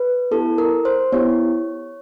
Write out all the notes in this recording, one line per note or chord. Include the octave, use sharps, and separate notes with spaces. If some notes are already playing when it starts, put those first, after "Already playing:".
Already playing: B4
B3 E4 G4 A4
A#4
C5
B3 E4 G4 C#5